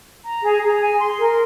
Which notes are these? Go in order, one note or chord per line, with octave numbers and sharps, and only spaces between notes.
A#5
G#4
G#4
G#5
C6
A#4